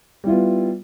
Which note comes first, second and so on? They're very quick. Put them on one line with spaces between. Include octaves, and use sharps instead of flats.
G3 E4 F4 B3